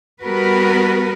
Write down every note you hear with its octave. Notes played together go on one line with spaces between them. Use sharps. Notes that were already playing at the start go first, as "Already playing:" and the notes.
G3 B3 F#4 A#4 B4